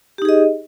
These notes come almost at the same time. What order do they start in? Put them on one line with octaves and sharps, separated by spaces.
G4 D#4 G#4 D#5